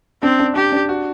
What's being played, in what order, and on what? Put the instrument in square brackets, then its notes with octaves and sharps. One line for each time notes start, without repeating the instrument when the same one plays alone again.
[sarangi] C4 [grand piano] D4
[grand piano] D4
[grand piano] D4 [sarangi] G4
[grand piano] D4
F#4